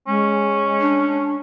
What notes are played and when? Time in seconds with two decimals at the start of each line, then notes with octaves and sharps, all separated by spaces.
0.07 G#3 C#4
0.80 D4